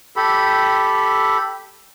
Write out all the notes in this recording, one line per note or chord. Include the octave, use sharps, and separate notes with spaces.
G4 A4 B5